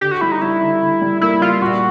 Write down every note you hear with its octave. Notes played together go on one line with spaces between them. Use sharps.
D3 G4
F#4
G3 E4
D#4
G3 E4
D3
D3
G3
A#3 E4
G3 F4
A#2 F#4